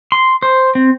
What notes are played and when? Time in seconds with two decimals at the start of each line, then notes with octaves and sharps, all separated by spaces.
0.12 C6
0.42 C5
0.75 C4